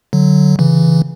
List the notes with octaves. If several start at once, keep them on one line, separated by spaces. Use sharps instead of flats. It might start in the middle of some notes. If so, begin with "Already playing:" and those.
D3 F#3
C#3 E3